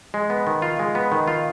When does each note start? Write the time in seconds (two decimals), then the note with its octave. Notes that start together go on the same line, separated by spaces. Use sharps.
0.14 G#3
0.30 B3
0.47 D#3
0.62 F4
0.79 G#3
0.95 B3
1.12 D#3
1.27 F4